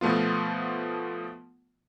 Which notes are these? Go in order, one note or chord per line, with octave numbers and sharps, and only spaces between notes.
B2 F3 A3 B3 F4